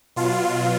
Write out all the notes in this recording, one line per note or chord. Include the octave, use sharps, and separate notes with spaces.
B2 F#3 F4